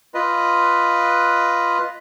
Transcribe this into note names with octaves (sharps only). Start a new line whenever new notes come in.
F4 B4 D#5